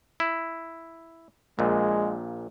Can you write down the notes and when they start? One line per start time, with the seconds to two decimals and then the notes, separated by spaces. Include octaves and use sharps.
0.20 E4
1.59 A#1 A#2 G#3